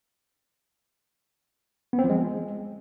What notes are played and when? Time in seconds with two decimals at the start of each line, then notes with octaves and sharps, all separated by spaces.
1.93 B3
1.99 C4
2.04 F3
2.10 G#3